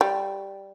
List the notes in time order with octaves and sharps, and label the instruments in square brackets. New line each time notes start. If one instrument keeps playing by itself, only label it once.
[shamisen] G3